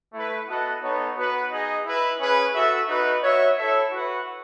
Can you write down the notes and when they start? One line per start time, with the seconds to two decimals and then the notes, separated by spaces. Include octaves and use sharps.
0.13 A3 E4 B4
0.48 B3 F#4 A4 D#5 F#5
0.82 B3 D#4 A4 C#5
1.17 B3 F#4 B4
1.51 D#4 G#4 D#5
1.85 E4 B4 E5
2.20 C#4 G#4 B4
2.54 F#4 A4 E5
2.88 D#4 F#4 B4
3.23 F#4 C#5 E5
3.57 E4 A4 C#5 E5
3.91 F#4 B4 F#5